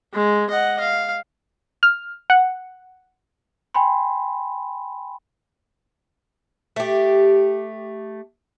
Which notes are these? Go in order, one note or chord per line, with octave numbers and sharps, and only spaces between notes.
G#3
D#5 F#5
F5
F6
F#5
G5 G#5 B5 C6
A3 G4